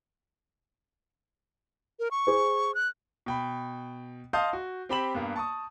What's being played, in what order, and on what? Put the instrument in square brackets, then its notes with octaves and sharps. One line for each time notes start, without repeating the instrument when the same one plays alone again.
[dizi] A#4
C#6
[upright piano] G#4 C5
[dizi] F#6
[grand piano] B2 G5 B5
D#5 F5 A5 C6 D#6 G6
F#4
C4 G4 G5 B5 E7 F#7
G2 A#3 B3
A5 C#6 D#6